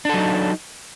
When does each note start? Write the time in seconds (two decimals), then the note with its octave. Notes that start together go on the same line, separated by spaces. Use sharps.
0.05 D4
0.09 A4
0.14 F#3
0.18 D#4